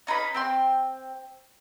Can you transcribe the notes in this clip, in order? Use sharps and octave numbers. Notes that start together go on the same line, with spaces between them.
C#4 D#4 B4 B5
C4 G5 C6